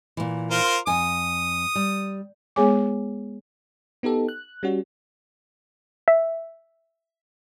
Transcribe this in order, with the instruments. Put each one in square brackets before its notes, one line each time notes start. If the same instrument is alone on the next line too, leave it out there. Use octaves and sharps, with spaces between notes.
[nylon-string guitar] A#2 E3
[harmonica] F4 A#4 C5
[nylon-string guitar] F2 G#5 [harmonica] D#6
[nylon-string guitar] G3
[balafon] G#3 B3 G#4 C#5 G#5 D6
[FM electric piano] B3 D#4 G4 A4
F#6
G3 C#4 F#4
[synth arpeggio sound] E5